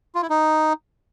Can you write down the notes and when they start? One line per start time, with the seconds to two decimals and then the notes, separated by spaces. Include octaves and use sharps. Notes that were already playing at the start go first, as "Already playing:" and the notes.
0.15 F4
0.22 E4
0.30 D#4